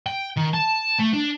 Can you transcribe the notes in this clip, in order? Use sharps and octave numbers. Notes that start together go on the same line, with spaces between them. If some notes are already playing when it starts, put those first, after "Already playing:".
G5
D#3
A5
A3
D4